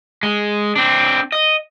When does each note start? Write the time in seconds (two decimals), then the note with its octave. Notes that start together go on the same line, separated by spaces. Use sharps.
0.23 G#3
0.76 C4 D4
1.32 D#5